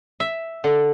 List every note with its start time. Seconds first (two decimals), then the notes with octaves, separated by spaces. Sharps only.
0.20 E5
0.64 D3